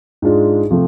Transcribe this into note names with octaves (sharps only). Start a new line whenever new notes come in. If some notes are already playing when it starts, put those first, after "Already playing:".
G#2 G#3 D4 F4
C3 F3 A3